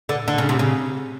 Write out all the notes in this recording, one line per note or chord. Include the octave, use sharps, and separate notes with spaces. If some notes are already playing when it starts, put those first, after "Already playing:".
D3
D3
C#3
C3
C#3